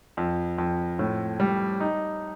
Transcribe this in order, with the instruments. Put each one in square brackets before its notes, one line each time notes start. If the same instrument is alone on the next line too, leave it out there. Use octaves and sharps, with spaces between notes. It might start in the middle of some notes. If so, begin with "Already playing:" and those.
[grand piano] F2
F2
A2
G3
D#4